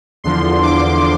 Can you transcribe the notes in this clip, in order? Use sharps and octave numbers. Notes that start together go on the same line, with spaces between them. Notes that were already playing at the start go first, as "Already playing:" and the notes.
E2 D3 F3 C6
D6